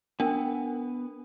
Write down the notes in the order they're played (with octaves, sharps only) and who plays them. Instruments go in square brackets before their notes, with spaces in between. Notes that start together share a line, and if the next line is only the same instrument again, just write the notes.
[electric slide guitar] B3 G#5 [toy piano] D4 A#4 G5